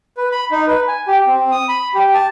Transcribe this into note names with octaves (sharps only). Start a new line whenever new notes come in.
B4
B5
D#4
B4
G#5
G4
C4
D#6
B5
G4
A5